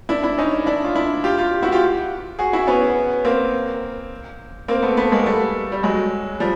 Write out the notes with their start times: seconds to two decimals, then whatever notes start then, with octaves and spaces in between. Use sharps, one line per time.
0.09 D4 E4
0.23 D4 E4
0.38 C#4 D#4
0.66 D4 E4
0.84 F4
0.95 D4 E4
1.24 F4 G4
1.38 F4 G4
1.62 E4 F#4
1.72 F4 G4
2.39 F#4 G#4
2.53 E4 F#4
2.67 B3 C#4
3.25 A#3 C4
4.68 A#3 C4
4.83 A3 B3
4.97 A3 B3
5.12 G#3 A#3
5.26 G3 A3
5.72 G3
5.83 F#3 G#3
6.40 F3 G3